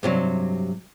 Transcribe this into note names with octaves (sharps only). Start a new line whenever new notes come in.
G2 C3 F#3